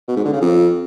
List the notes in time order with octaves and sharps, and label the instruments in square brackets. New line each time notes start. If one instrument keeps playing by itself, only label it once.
[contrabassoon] B2
G#2
D3
C#3
F2